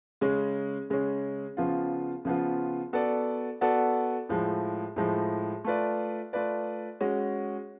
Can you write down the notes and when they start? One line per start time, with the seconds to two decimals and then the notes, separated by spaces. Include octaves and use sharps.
0.21 C#3 G#3 C#4
0.90 C#3 G#3 C#4
1.57 C#3 F3 B3 F4
2.25 C#3 F3 B3 F4
2.93 B3 F#4 A4 D5
3.61 B3 F#4 A4 D5
4.29 A2 F3 G#3
4.96 A2 F3 G#3
5.64 A3 F4 B4 D5
6.33 A3 F4 B4 D5
7.01 G#3 C#4 F#4